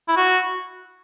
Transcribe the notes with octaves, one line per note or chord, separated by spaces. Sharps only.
E4
F#4